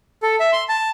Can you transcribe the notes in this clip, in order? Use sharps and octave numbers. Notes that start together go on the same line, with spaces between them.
A4
E5
C6
A5